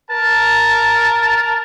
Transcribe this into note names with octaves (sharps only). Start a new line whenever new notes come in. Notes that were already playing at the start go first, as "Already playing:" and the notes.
A#4 A5